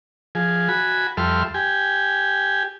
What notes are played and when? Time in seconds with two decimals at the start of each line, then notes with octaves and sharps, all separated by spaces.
0.35 F3 G#4
0.69 F#4 G#5 B5
1.17 F2 G3 A4 E5 C6 F6
1.54 G4 G#5